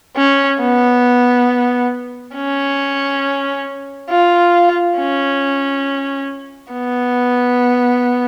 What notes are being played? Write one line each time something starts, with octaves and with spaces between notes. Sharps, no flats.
C#4
B3
C#4
F4
C#4
B3